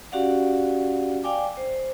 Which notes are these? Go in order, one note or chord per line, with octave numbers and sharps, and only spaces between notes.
C#4 F#4 G4 D5 F5 F#5
D5 F5 G5 G#5 D6
C5